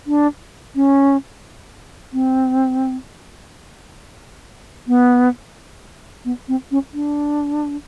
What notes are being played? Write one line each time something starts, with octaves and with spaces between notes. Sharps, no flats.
D4
C#4
C4
B3
B3
C4
C#4
D4